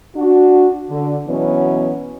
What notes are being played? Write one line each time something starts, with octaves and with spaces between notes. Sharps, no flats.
D4 F#4
D3
B2 E3 F#3 B3 C#4